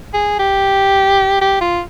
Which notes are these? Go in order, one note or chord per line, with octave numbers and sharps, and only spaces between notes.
G#4
G4
G4
F4